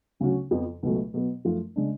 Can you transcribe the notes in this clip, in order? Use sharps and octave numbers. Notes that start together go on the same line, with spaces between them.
D2 C#3 F#3 C#4 F#4
F2 F3 B3
C#2 B2 F#3 A3
B2 F#3 B3
F#2 F3 A3 F4
C#3 G#3 D4